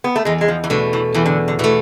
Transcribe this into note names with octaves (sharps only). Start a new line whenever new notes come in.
B3
A3
E2 G#3
G#3
F3
E3
B2 D3 A3
E3
E2 E3
D3
D3
B2 E3 A3